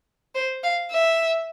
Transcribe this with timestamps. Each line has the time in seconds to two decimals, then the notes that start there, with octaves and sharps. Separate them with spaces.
0.35 C5
0.63 F5
0.92 E5